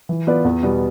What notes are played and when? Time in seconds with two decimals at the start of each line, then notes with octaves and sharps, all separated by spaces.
0.09 E3
0.27 B3 F4 B4 D5
0.45 E2
0.63 B2 G3 B3